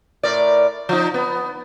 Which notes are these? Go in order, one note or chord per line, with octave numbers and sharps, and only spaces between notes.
A2 A#4 D5
F3 D#4
B3